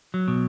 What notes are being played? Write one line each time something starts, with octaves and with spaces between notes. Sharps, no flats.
F#3
B2